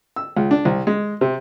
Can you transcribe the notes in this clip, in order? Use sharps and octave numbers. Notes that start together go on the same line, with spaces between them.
E6
C#2
D4
C2
G#3
C3